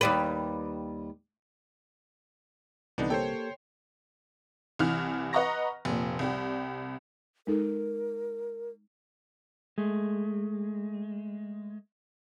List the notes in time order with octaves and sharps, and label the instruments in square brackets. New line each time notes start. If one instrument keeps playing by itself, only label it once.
[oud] D#2 G3 B4
[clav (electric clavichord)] C2 D3 E3 [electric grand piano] B3 D4 D#4
[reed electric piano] A#3 G4 A4 [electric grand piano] C5 C#5 G5
[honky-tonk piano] C2 E3 F6
B4 D#5 F#5 A#5 C#6 A#6
F1 A#2
C2 G3 G4
[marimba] G#3 D#4 A4 [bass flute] A#4
[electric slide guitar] G#3 A3